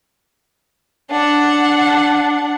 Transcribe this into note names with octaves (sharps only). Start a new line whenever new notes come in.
D4 F#5